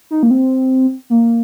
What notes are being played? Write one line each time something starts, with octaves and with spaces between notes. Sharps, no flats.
D#4
A#3
C4
A#3